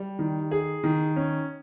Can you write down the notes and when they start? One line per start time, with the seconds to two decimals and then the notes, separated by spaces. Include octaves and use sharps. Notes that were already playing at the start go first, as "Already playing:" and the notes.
Already playing: G3
0.19 D#3
0.51 G#4
0.84 D#3
1.16 C#4